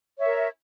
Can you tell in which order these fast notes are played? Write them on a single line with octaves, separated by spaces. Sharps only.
C#5 E5 A#4